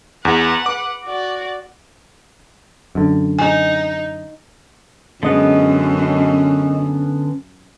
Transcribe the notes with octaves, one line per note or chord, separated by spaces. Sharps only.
E2 B4 F#5
D6
F#4 D5
F#2 D3
D#4 G#5
F#2 D3 G#3 B3 C#4 D#5